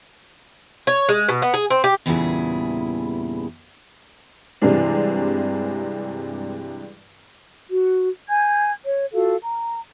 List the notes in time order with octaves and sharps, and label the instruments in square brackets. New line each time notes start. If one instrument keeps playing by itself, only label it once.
[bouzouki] C#5
G#3
B2
B3
G#4
C4
G4
[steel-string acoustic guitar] E2 G2 A#2 C#3 E4 G#4
[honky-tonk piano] G2 C3 E3 G#3 D4
[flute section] F#4
G#5 G6 G#6
C#5
F4 F#4 A4 F5
A#5